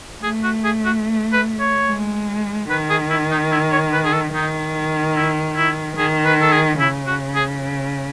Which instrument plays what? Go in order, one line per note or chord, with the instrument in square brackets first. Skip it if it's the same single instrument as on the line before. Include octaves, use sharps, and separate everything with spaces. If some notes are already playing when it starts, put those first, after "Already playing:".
[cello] A3 [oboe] G#4
[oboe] F#4
G#4
F#4
B4
C#5
[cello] G#3
[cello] D#3 [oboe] B4
[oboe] G#4
E4
D#4
E4
C#5
B4
G#4
A4
[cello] D#3 [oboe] D#4
[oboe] E4
E4
[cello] D#3 [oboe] G#4
[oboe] B4
A4
G#4
[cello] C#3 [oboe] E4
[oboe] F#4
G#4